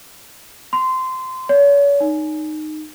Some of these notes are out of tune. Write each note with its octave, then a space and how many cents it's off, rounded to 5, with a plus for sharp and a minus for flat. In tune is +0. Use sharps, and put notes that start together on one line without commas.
C6 -20
C#5 +40
D#4 -15